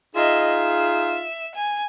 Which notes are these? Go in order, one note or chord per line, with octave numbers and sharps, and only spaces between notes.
D#4 F4 G#4 D#5 E5
E5
G#5